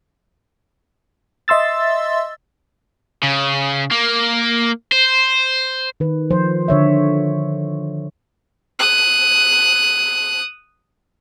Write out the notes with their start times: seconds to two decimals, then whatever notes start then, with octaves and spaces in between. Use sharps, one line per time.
1.48 D#5 E5 C6 E6 A6
3.23 C#3
3.91 A#3
4.92 C5
6.00 D#3 B4
6.30 F3 C5
6.68 D3 C#5 E5
8.79 D#6 F#6